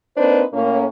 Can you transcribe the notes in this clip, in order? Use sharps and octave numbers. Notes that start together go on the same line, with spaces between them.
A#3 C4 D4 D#4 B4 C5
A2 A#3 C#4